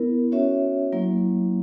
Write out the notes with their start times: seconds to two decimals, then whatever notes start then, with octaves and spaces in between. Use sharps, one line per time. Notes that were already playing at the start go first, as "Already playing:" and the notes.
Already playing: B3 E4 A#4
0.32 C#4 F#4 C#5 E5
0.92 F#3 A#3 E4